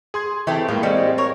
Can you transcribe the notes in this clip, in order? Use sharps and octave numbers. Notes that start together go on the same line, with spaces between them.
G#4 C6 G#6
E3 A3 C4 G4 A5
A2 G#3 A#3 F4
G3 G#3 C4 F5 C#7
A#4 C#5